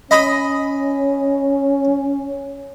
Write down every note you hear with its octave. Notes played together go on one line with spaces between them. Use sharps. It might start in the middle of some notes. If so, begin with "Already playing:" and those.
C#4 D#5 B5